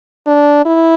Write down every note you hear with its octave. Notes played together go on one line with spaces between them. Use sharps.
D4
E4